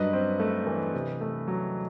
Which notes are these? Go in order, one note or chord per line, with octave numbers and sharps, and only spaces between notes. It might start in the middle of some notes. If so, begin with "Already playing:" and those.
Already playing: G2 F#3 B4 D#5
C4
A3
E3
C3
A3
F#3